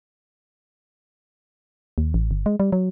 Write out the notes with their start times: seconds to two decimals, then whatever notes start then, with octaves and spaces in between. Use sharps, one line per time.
1.98 D#2
2.14 A1
2.31 G1
2.46 G#3
2.60 G3
2.72 F#3